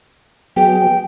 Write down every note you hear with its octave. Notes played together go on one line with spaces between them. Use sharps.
F#3 B3 G#4 G5